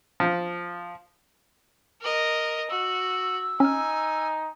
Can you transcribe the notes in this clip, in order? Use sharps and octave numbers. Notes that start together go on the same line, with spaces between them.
F3
A#4 D#5
F#4 E6
C#4 D#4 G#5 F6